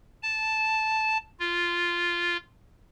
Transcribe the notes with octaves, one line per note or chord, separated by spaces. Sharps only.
A5
F4